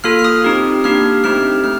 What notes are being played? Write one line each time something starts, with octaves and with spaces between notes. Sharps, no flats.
A#3 F4 A4 F6
F6
D#6
C4 D#4 G4
A#3 D4 G4 F6
A3 C4 D#4 G4 F6
A3 F6